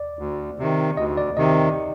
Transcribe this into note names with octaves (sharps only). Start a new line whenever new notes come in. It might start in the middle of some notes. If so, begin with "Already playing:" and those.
Already playing: D5
D2
C3 D#3
D2 D#5
D5
C3 D#3 D#5